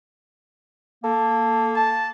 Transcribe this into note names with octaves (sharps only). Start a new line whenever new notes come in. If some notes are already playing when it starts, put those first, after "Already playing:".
A#3 A4
A5